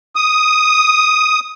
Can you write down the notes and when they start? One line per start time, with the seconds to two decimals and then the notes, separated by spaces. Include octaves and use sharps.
0.16 D#6